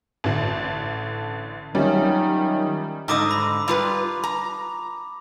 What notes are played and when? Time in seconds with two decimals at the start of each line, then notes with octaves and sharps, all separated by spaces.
0.24 A1 D3
1.75 D#3 F#3 G3 C#4 F4 E5
3.08 G#2 D3 D#5 A#5 D6 D#6
3.31 B5
3.68 G3 F4 B4
4.24 A#5